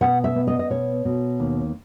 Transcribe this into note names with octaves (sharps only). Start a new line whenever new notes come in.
B2 F#5
E5
B3
D#5
D#5
B2 C#5
B2
D#2